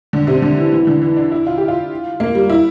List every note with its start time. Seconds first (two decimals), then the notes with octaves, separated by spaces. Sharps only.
0.13 D3
0.27 C3
0.42 D3
0.57 E3
0.73 E3
0.87 D3
1.02 E3
1.16 D4
1.32 E4
1.47 F4
1.58 G4
1.68 F4
2.20 A#3
2.35 G3
2.50 E4